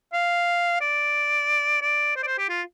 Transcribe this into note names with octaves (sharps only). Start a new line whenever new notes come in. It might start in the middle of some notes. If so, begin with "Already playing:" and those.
F5
D5
D5
C5
D5
C5
G4
F4